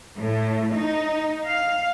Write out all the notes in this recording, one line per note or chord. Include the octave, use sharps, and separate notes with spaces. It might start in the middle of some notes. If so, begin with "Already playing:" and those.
A2
D#4
F5